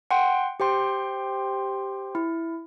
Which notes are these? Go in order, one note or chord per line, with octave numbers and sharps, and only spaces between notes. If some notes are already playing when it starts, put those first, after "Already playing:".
F#5 G5 C6
G4 C5 G5 C6
E4